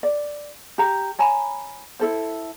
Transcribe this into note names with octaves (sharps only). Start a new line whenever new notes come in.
D5
G4 A#5
C#5 G#5 A#5 B5
E4 A4 C5